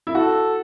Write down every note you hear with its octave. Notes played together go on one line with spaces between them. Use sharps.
E4
F#4 A4